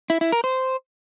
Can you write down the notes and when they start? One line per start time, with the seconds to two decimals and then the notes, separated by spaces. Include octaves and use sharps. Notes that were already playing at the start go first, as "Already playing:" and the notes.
0.10 E4
0.21 E4
0.32 A#4
0.44 C5